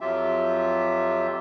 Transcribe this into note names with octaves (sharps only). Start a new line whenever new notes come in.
F2 F#3 F4 G4 E5